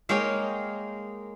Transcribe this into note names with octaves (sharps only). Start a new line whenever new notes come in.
G#3 A#3 D#4 A#4 C#5 G5